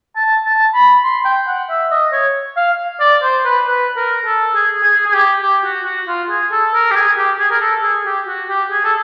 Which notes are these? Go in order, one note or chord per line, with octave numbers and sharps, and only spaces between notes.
A5
A5
B5
C6
G5
F#5
E5
D#5
C#5
F5
D5
C5
B4
B4
A#4
A4
G#4
G#4
G#4
G4
G4
F#4
F#4
F4
G#4
A4
A#4
G4
G#4
G4
G#4
A#4
A4
G#4
G4
F#4
G4
G#4
A4